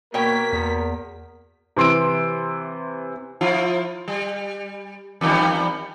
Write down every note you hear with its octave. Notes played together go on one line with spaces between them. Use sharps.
B2 A#3 A#4 C#5 G5 B6
E2
C3 E3 C6 E6 D7
F3 E4 F4
G3
E2 D#3 G3